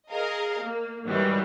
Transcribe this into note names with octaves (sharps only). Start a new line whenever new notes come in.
G#4 A#4 D#5 F5
A#3
G#2 D#3 E3 F#3 G3